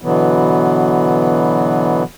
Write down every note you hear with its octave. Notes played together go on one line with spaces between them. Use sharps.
B2 D3 E3 F#3 B3